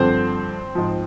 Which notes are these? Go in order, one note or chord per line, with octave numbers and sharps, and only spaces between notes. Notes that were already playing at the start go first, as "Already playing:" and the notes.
Already playing: G2 D3 F3 C4 C5
G#2 F3